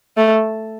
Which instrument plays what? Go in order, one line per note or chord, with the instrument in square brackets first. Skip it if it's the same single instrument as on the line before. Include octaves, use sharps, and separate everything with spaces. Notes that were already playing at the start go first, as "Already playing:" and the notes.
[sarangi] A3